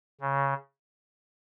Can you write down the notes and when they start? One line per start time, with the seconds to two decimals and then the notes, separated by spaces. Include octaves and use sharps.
0.21 C#3